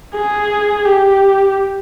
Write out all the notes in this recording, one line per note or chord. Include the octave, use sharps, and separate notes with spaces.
G#4
G4